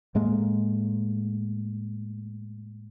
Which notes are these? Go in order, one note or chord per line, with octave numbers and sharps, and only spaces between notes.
A2 G#3 A#3